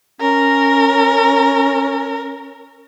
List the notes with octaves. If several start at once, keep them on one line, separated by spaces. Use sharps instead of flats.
C#4 A#4